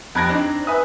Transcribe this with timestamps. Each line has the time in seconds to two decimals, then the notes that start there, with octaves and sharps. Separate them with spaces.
0.15 F2 B5 F#6 G#6 A#6 D7
0.29 C4 D4 D#4
0.67 B4 E5 G#5 D#6